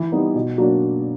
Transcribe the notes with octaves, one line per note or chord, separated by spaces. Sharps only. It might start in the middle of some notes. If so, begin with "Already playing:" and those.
Already playing: E3
G3 B3 D#4
B2
F#3 A#3 D4 F#4